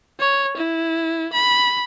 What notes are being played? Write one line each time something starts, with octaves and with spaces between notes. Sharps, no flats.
C#5
E4
B5